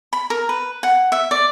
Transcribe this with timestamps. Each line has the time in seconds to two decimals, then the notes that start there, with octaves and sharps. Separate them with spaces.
0.13 B5
0.30 A#4
0.49 B4
0.83 F#5
1.12 E5
1.31 D5